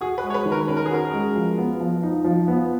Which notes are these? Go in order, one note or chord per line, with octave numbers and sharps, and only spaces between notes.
F#4 G#4
B4
G#3
C#5
B4
D#3
A#4
C#4 B4
A#4
G#4
F#4 A#4
G#3
F3
B3
F3
D#4
F3
B3